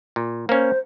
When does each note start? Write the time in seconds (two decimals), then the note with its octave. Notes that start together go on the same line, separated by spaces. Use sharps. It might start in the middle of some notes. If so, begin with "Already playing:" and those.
0.16 A#2
0.49 A#3 C#4 C5